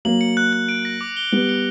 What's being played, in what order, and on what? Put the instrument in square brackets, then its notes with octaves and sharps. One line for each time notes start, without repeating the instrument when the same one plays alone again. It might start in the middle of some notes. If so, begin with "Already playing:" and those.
[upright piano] F#3 A#3 [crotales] F#7
[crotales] C#7
F#6
F#6
D7
A#6
D6
G7
[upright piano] G3 B3 [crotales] G7
[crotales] C#7